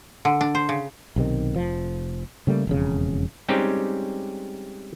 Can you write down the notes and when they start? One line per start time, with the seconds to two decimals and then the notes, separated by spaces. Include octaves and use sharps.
0.25 D3
0.41 D4
0.55 C5
0.69 C#3
1.16 B1 C3 D#3
1.56 F1 F3
2.47 C#3 G3 A3 A#3
2.67 E1 F2 C#3
3.49 G3 G#3 C4 C#4 D#4 G4